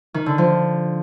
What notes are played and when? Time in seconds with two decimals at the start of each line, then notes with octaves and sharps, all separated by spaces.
0.14 D#3
0.26 D3
0.38 F3